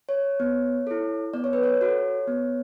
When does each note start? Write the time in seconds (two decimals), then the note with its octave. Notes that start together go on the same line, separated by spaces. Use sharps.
0.09 C#5
0.40 B3
0.87 E4 A4
1.33 B3 D5
1.44 C#5
1.53 B4
1.64 C#5
1.81 F#4 A4
2.28 B3